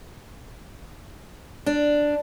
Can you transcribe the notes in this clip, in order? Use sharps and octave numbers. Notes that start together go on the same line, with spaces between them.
D4